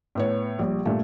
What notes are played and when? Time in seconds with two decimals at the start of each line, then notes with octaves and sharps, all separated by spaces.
0.15 A2 B3 C#5
0.59 A#1 G3
0.85 G2 A#2 A3